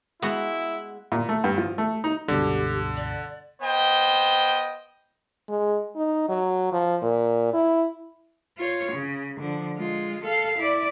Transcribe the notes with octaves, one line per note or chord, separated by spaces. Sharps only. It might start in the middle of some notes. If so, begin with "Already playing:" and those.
G#3 B3 E4 F#4 F#5
A#2
A3
G2
F3
A3
D#4
C#2 G2 B2 D3 G4
D5
B3 C5 D#5 G5
G#3
D#4
F#3
F3
A#2
E4
F4 C#5
C#3
D3 F3
G#3 F4
A4 F5
E4 D5